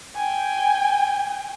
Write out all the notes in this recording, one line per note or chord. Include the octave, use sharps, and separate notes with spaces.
G5 G#5